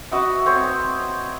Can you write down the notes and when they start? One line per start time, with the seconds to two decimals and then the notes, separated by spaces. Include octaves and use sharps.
0.11 F#4 B4 D#5 E5
0.46 B3 C4 C#5